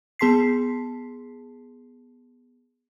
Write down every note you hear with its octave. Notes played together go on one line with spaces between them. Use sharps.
B3 G#4 A5 C6 B6 C7